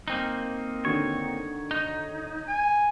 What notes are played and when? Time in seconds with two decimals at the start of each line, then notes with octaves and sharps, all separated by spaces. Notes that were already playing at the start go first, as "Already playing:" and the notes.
0.08 A#3 C4 D#4
0.85 D3 D#3 F#4 C#5
1.71 D#4
2.48 G#5